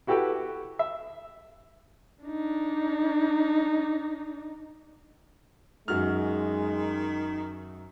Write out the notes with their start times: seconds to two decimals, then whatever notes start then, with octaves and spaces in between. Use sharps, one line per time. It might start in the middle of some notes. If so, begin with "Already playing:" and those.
0.07 E4 F#4 G4 A4 B4 G5
0.79 E5
2.25 D4 D#4
5.88 F#2 D#3 G#3 F#4 F6